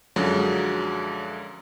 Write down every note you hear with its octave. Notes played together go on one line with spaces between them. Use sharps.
F#2 D3 F3 F#3 G#3